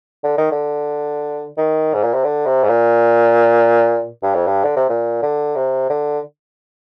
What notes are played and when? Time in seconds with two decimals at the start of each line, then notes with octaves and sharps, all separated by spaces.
0.24 D3
0.38 D#3
0.52 D3
1.58 D#3
1.94 G#2
2.03 A#2
2.14 C3
2.24 D3
2.46 C3
2.63 G#2
2.69 A#2
4.23 G2
4.34 F2
4.47 G2
4.64 D3
4.76 C3
4.89 A#2
5.22 D3
5.56 C3
5.90 D3